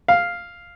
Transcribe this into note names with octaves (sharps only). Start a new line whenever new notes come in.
F5